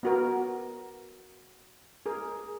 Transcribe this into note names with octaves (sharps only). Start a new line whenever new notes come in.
B3 F#4 A#4
G#4 A#4